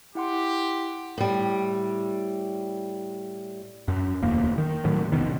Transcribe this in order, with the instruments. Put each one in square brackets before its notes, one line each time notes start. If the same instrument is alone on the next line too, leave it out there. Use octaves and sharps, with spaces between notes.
[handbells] E4 F#5 C6 [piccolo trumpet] G4
[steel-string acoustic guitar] A2 G3
[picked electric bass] F#2
E1 D2 A#3
D#3
A2 D#3 F#3
F1 C#2 B2 D#3